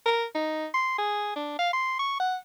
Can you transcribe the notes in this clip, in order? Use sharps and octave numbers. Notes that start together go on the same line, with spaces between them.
A#4
D#4
C6
G#4
D4
F5
C6
C#6
F#5